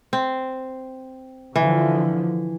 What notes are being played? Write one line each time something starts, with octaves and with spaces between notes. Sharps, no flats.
C4
D3 E3 F3